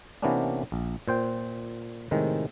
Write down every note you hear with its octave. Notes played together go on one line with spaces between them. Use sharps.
C3 E3 A#3 B3 C#4 D4
A#1
A#2 C5 G5
A2 C3 D#3 G#3